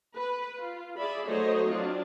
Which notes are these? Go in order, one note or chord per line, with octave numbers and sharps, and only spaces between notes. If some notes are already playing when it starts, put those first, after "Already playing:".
B4
F4
G#4 D5 E5 B5
F#3 A3 D#4 C5 C#5 D#5
F#3 C4 D4 F4